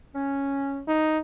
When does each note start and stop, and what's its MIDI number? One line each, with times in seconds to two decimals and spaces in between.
0.15 0.80 61
0.88 1.19 63